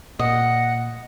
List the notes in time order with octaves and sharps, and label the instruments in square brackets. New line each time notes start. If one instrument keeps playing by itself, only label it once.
[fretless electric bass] A#2 [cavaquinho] D#5 [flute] F#5